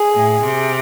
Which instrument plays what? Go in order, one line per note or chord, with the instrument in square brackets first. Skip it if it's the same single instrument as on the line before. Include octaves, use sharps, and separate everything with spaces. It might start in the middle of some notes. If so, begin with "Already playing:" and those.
Already playing: [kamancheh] G#4
[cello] A2
C3